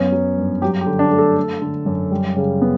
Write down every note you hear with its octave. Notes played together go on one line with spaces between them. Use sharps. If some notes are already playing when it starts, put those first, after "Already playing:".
Already playing: F#2 B3 C#4
F#3
G2
F#3 G4
G4
D3
D4
A3
A4
A3
D3
F#2
G3
C#3
B3